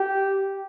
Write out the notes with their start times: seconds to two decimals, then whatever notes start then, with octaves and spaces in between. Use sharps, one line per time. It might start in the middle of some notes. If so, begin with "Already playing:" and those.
Already playing: G4